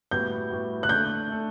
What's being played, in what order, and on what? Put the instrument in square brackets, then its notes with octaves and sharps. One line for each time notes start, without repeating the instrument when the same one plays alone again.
[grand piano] A2 G3 B3 F#4 [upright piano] G6
[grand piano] A2 G3 B3 F#4
[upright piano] F#6
[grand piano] A3 D4 A4 [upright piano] G6
[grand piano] A3 D4 A4